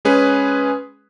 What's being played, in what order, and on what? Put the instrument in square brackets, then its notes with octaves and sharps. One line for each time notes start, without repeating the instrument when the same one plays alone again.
[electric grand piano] G#3 C#4 G#4 B4